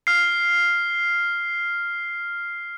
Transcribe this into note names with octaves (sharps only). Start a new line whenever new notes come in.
F6 C7